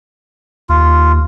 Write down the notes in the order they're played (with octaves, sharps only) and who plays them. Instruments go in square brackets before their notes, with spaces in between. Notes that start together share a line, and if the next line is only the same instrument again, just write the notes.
[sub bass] D#2 [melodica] F4